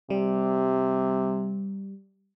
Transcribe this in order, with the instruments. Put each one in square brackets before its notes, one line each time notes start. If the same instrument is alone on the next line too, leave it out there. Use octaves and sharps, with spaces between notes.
[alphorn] C3 [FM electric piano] G3